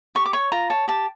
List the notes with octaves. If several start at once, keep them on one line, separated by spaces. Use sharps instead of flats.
G4 C#6
D6
C#5 C#6
F4 A#5
C#5 A5
G4 A5